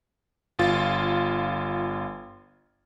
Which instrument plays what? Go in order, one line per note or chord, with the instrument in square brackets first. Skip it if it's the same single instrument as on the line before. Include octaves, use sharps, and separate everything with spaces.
[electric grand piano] G1 F4 A6